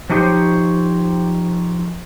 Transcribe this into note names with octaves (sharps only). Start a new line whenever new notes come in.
F3 F#3 D#4 G4 C5 C#5